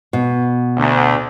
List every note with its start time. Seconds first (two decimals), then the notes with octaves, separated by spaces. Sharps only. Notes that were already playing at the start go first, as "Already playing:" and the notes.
0.13 B2
0.77 D2